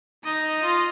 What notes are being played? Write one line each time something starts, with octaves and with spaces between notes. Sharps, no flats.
D#4 D#5
F4